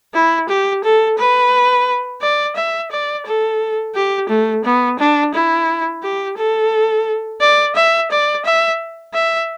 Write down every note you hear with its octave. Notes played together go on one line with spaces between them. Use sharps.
E4
G4
A4
B4
D5
E5
D5
A4
G4
A3
B3
D4
E4
G4
A4
D5
E5
D5
E5
E5